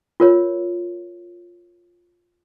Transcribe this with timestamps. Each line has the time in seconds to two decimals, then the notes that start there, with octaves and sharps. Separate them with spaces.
0.20 F4 A#4 C#5